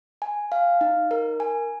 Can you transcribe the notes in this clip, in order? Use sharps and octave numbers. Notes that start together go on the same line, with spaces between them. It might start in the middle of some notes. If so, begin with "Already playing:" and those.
G#5
F5
D#4
A#4
G#5